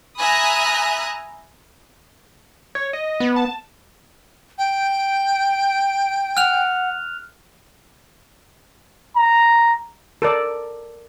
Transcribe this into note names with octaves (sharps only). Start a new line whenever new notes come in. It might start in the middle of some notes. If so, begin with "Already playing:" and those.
E5 G#5 A#5 B5 D#6 F#6
C#5
D#5
B3
A5
G5
F#5 F6 F#6 F7
A#5
A4 A#4 D5